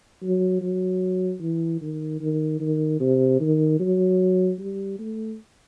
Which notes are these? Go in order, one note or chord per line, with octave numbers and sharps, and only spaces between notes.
F#3
F#3
E3
D#3
D#3
D#3
C3
D#3
F#3
G3
A3